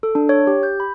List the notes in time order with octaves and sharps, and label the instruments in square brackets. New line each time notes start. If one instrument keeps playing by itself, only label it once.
[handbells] A4
D4
C#5
G4
G6
B5